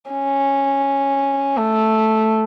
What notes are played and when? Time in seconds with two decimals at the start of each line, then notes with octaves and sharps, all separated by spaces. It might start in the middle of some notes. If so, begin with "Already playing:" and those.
0.11 C#4
1.57 A3